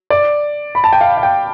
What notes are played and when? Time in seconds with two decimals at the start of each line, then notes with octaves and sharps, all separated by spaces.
0.10 D5
0.75 B5
0.84 A5
0.93 G5
1.01 F5
1.17 F5
1.23 G5